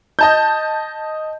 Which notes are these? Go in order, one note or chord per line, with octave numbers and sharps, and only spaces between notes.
D#5 A5 G6